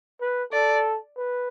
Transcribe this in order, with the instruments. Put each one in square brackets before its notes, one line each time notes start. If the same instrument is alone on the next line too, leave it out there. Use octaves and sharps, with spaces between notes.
[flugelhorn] B4
[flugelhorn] A4 [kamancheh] D5
[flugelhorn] B4